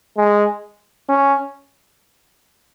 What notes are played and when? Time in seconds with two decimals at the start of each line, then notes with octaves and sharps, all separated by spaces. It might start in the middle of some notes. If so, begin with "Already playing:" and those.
0.17 G#3
1.09 C#4